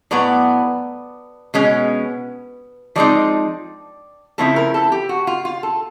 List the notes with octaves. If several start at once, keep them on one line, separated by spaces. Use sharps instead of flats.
A2 F#3 B3 D5
B2 G#3 C#4
F3 G#3 C4 D#4 D5
C#3 F3 A3 C4 E4 A4
A#4
A4
G4
F#4
F4
F4
A4